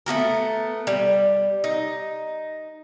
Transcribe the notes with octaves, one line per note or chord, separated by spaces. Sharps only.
A3 B3 F#4 A#4
G3
D#4